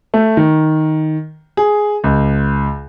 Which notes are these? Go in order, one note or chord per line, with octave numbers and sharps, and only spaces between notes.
A3
D#3
G#4
C#2